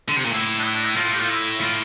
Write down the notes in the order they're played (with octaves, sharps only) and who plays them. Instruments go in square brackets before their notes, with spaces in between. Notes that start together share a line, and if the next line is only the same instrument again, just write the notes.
[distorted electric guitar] D3
C3
A#2
[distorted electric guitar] A2 [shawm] E4
[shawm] D4
E4
D4
E4
[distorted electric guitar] A2 [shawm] F4
[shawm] G4
F4
E4
[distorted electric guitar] A2 [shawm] F4